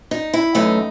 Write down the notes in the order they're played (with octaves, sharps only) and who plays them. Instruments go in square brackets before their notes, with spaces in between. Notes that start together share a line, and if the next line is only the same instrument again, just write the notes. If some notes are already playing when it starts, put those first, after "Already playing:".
[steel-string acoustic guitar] D#4
E4
F#2 E3 A3 D#4